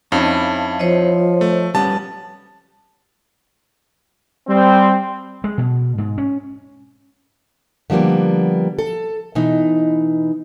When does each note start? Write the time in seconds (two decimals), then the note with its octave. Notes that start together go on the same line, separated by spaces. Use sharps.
0.12 F2 C#4 D#4 E4 F5 A5
0.79 F3 C5 C#5 D#5
1.41 A3
1.75 G3 B3 C#4 A5
4.47 G3 C4
5.44 G#3
5.58 B2
5.98 G#2
6.18 C#4
7.90 D3 F3 G3 A#3 B3
8.79 A4
9.35 B2 E3 D#4